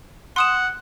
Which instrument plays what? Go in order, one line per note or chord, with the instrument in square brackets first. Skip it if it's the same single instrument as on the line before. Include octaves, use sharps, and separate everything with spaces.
[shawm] F#5 [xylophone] C6 D#6 E7